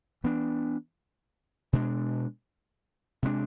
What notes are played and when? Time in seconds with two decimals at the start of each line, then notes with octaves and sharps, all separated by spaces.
0.24 E3 B3 D4
1.73 B2 G#3 D4
3.23 C3 G#3 B3 D4